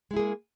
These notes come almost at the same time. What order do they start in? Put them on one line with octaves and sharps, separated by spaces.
G#3 E4 G#4 A#3